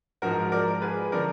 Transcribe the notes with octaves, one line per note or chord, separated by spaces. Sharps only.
G#2 F3 F#4 A#4
A#4 D5
G#4 B4
D3 F3 A#4 D5